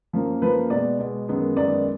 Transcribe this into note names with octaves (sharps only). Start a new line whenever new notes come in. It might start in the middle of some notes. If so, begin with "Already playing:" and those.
F#2 F3 A#3
F#2 F3 A#3 B4
B2 G#3 B3 D5
B2 G#3 B3
F#2 D#3 G#3 B3
F#2 D#3 G#3 B3 D5